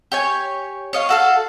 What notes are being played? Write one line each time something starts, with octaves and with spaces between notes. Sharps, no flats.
G4 C#5 G#5
C#5 D#5 F5
F#4 A4 F5